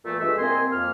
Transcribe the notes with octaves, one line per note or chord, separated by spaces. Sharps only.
A#2 E3 A3
G2 G#3 F4 A4 E5
C2 A#3 C4 D#5 G#5 C6
F2 A#3 F6